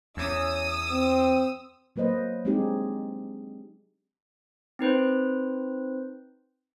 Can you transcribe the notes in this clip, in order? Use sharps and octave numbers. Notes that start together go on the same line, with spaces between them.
E2 C#4 D#6 E6
C4
F#3 A#3 B4 C5 D#5
G#3 C4 D4 D#4 G4 G#4
C4 D#4 B4 C5